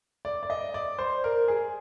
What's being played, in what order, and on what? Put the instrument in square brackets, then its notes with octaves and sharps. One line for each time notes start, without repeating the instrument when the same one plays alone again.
[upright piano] D5
D5
D#5
D5
C5
A#4
G#4